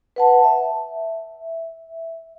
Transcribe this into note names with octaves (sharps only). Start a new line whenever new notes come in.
B4 F#5 A5
E5